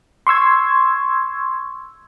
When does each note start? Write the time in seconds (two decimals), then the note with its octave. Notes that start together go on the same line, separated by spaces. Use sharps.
0.27 C6 C#6 E6 G#6